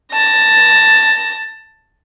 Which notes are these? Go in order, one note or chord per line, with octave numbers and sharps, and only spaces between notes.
A5 A#6